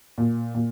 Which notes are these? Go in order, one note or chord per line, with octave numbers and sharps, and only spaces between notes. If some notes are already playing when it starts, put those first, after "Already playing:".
A#2
A#2